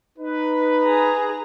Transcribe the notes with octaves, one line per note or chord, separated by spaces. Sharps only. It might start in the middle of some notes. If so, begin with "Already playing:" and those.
D#4 B4
G#4 A#5